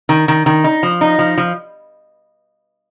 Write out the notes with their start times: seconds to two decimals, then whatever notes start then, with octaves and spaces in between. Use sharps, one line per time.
0.09 D#3
0.28 D#3
0.46 D#3
0.64 D#4
0.83 F3
1.01 D#4
1.19 F3
1.38 F3